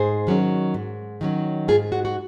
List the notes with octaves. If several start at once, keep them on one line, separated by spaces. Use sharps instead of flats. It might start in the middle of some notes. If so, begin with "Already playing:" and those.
Already playing: G#2 G#4 C5
D#3 F#3 C#4
G#2
D#3 F#3 C#4
G#2 F4 G#4
F#4
F#4